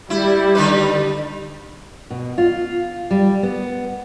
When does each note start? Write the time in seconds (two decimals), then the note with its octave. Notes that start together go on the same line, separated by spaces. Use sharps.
0.10 G3 E4
0.55 D3 D#4 B4
2.10 B2
2.38 F4
3.11 G3
3.43 B3